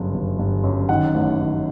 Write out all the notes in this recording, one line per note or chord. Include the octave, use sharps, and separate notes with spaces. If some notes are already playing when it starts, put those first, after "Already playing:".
Already playing: G1 F#2 C#3
G1
G1
F#2
D#3 F#5
A1
D#3